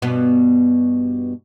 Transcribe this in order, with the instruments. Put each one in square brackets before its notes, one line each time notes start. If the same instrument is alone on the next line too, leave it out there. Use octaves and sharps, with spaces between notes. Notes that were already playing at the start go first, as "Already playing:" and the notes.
[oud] G2 B2 B3